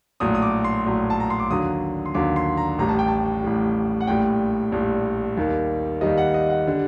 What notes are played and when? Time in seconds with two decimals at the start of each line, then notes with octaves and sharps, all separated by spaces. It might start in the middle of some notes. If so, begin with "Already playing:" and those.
0.20 A#1 A2 F#3 D#6
0.35 D#6
0.42 D6
0.64 C6
0.86 A#1 A2 F#3
1.10 A5
1.20 A#5
1.30 C6
1.39 D6
1.50 D#2 D3 F#3 D#6
2.06 C6
2.14 D#2 D3 F#3 D6
2.36 C6
2.57 A#5
2.78 A1 A2 G3 A#5
2.89 A5
2.99 G5
3.08 A5
3.44 A1 A2 G3
4.01 F#5
4.07 A#1 A2 G3 G5
4.72 A#1 A2 G3
5.37 D#2 D#3 G3
6.01 D#2 D#3 G3 D#5
6.17 F#5
6.34 D#5
6.50 F#5
6.67 D3 G3